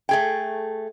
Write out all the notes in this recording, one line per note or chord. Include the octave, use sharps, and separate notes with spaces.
A3 G#4 G5